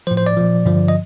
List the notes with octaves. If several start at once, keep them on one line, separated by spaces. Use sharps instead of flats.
A2 F3 C5
C5
D5
A#2 F3
G2 D3 F3
D#5